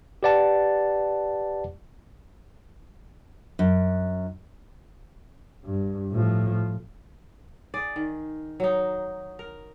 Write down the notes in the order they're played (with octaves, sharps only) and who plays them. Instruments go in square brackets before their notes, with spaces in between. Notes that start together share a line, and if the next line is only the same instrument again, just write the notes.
[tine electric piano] G4 B4 D5 F#5 A5
[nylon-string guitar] F#2
[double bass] G2
A2 F3
[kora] G#4 D5
D#3
F#3 D#4
A#4